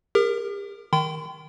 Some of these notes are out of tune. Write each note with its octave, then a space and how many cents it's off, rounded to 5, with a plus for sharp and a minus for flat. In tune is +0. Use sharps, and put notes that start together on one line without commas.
G4 +45 A#4 +0
D#3 +0 G5 -15 C6 -45